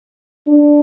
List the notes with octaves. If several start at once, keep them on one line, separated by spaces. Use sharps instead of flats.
D4